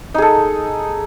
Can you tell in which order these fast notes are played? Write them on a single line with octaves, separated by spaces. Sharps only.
D#4 G#4 A4